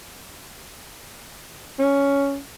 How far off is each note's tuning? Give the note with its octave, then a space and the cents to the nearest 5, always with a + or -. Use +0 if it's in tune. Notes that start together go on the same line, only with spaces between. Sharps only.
C#4 +10